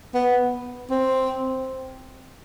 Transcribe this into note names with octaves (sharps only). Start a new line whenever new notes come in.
B3
C4